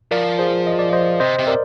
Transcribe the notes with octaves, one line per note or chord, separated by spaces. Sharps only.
F3 A#4 D5
G#4 C5
D#5
D5
C5 D#5
C3 C5 D#5
C3
A#4 D5